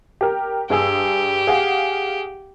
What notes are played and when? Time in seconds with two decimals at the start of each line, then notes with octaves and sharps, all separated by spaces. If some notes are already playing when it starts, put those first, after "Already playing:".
0.21 G4 A#4
0.70 G2 G4 G#4 E6
1.47 G#4 F5 F#5